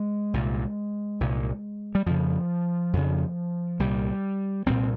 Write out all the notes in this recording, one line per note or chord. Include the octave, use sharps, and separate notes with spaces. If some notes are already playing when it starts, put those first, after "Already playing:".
Already playing: G#3
C2 A#2
C2 A#2
G3
F2 C#3 F3
F2 C#3
C2 A#2 G3
C2 A#2 C4